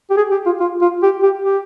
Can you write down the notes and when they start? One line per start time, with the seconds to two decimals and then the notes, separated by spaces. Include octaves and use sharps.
0.10 G4
0.17 G#4
0.32 G4
0.46 F4
0.60 F4
0.81 F4
1.03 G4
1.23 G4
1.45 G4